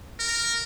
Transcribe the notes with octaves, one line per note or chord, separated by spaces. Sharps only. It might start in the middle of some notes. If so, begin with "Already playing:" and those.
A#4